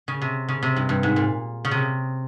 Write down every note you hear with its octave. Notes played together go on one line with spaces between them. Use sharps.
C#3
C3
C#3
C3
G2
G2
G#2
A#2
C#3
C3